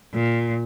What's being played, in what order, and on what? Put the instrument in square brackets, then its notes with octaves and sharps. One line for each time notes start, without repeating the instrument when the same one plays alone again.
[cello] A#2